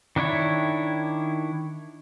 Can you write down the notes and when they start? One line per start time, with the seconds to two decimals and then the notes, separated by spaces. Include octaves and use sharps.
0.16 D#3 D4 E4 C#5